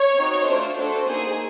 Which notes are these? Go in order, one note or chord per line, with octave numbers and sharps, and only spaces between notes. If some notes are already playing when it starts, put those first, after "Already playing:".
Already playing: C#5
C4 D#4 F#4
A3 D4 F4 C5
D4 F#4 A4 C5
A#3 D#4 G#4